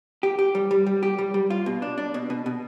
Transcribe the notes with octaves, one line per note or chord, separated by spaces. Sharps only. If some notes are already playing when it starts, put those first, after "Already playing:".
G4
G4
G3
G3
G3
G4
G3
G3
F4
B2
D4
D4
B2
B2
B2